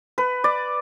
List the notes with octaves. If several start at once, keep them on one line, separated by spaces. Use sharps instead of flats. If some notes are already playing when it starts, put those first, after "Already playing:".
B4
D5